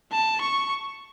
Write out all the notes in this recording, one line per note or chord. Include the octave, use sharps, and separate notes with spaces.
A5
C#6